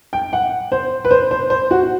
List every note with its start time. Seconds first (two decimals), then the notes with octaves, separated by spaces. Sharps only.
0.13 G5
0.33 F#5
0.72 C5
1.05 B4
1.11 C5
1.31 C5
1.50 C5
1.71 F#4